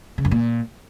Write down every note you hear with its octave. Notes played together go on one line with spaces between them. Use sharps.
C#3
F#2
A#2